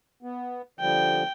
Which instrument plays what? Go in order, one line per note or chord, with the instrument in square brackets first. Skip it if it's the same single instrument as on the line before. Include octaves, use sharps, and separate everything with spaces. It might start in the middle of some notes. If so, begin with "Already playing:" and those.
[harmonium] B3
[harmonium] D3 F3 G3 [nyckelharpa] G5